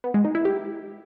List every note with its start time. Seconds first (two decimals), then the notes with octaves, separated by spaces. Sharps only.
0.04 B3
0.14 G#3
0.25 D#4
0.35 E4
0.45 G4